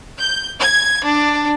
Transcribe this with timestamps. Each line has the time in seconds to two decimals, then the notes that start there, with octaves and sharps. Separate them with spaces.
0.19 G6
0.59 G#6
1.05 D4